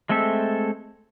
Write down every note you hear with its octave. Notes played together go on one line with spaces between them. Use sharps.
G#3 A3 C4 A4 E5